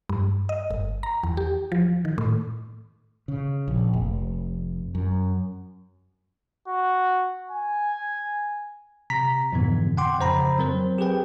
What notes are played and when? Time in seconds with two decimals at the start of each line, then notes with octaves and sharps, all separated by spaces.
0.09 G2
0.49 D#5
0.71 G1
1.03 A#5
1.23 E2
1.37 G4
1.72 F3
2.05 D#3
2.18 A2
3.28 C#3
3.68 A#1
3.93 F1
4.95 F#2
6.68 F#4
7.51 G#5
9.10 C3 A#5 B6
9.52 F2 G#2 B2 D3 E3 B3
9.97 F#5 G5 C6 D6
10.19 F2 C#3 C5 A#5 B5
10.59 F#3 C4 A#4 C5
10.98 G4 G#4 B4 G5